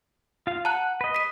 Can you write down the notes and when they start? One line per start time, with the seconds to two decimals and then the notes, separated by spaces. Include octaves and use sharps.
0.47 F4 F5
0.65 F#5 A5 A#5 F#6
1.01 B4 D#5
1.15 B6 D#7